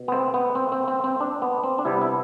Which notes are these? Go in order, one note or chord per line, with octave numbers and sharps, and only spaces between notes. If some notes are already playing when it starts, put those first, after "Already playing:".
Already playing: B2
B3
C4
B3
C4
C4
C4
C4
D4
B3
C4
D4
C3 G3 B3 E4
E4